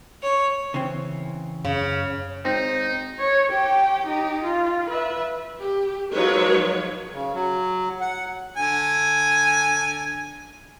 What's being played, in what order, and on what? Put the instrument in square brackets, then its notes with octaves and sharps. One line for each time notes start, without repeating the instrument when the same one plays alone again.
[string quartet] C#5
[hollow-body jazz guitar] C#3 E3 C4
[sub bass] F#2 [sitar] C#3
[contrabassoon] G#1 [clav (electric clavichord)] C4 [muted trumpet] D#4
[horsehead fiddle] C#5
G4 G5
D#4 G4
F4
B4 E5
[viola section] G4
F3 F#3 G#3 D#4 B4 C#5
[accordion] C#3
F#3
F#5
[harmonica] D3 G#5